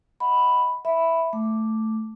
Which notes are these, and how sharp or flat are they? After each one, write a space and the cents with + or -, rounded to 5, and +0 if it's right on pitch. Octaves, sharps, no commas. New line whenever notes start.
D#5 +25 F#5 +0 B5 +0
E5 +0 B5 +0
A3 +0 D6 +0